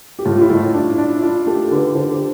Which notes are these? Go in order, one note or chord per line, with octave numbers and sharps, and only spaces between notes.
G4
A2 F4
F4
E4
A2
E4
D4
D4
D4 F4
A3 G4
D3 B4
D3 C5
G4